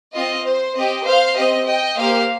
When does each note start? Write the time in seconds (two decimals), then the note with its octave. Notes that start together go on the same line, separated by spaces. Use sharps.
0.14 C4 F4 D#5
0.45 C5
0.75 C4 G4 D#5
1.05 C5 F5
1.36 C4 G4 D#5
1.66 D#5 G5
1.96 A#3 G4 C5 F5